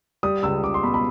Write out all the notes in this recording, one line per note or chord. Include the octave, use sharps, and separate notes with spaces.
G3 D#6
C#2 E6
C#2 D6
C6
B2 B5
B5